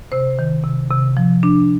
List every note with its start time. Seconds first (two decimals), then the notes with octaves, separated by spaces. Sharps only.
0.12 C3 C5
0.39 D#3
0.64 C3
0.90 C3
1.17 F3
1.43 D4